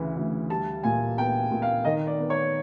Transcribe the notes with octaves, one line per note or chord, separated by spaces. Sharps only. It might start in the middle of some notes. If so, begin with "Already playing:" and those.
Already playing: D2 C#3 E3
D2
G3 A5
A#2 G#5
B3 G5
A#2
F5
D#3 D#5
D5
B3
C#5